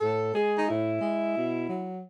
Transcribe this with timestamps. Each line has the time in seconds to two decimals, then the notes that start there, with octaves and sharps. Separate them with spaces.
0.01 A2 A4
0.34 G#3 G#4
0.58 D#4
0.67 A2 E4
1.01 G#3
1.35 B2
1.68 F#3